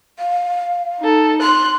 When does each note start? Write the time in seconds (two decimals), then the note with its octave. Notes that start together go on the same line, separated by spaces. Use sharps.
0.19 F5
1.00 D#4 A4
1.42 C6 F#6